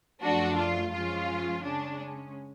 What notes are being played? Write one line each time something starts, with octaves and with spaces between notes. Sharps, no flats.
F#2 F3 A3 D4 F#4
F4
F#2 F3 G#3 C#4 F4
C#3 G#3 C#4 D4